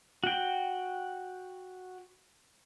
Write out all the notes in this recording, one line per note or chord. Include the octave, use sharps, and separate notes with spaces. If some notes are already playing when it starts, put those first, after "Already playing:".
F#4 G5